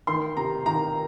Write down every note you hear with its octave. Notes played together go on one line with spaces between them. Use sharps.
D#3 C6
C3 A#5
D#3 A#5